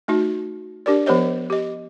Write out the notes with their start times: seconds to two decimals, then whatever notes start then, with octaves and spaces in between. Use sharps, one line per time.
0.08 A3 D#4 F#4
0.86 D4 G4 A#4 D5
1.06 F3 B3 G4 C5 C#5 D#5
1.50 G4 D#5